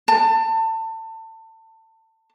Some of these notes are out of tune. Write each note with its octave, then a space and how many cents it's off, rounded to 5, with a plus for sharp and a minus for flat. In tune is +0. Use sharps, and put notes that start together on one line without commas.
A5 +30